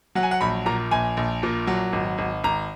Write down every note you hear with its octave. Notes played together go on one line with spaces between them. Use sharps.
F#3 F#5
G#5
F#5
A#1 B5
A#2 A#5
A#1 G#5
A#1
A#2
F#3
G#1
G#1
G#1 A#5